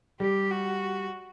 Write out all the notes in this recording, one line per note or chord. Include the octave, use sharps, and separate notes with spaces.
G3 G4
F#4